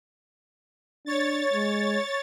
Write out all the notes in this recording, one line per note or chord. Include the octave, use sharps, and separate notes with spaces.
D4 C#5 A6
G#3